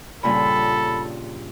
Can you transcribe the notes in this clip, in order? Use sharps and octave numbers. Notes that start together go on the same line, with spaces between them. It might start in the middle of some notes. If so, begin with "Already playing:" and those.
G2 A#2 C#3 A4 B5